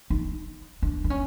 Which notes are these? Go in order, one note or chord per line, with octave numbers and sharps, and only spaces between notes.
D#4
D4
D4
C#4